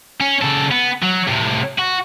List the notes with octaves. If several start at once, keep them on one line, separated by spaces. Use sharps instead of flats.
C#4
C#3 A4
B3
F#3
A2 C3
F#4